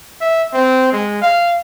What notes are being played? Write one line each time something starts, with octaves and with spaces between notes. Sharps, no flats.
E5
C4
G#3
F5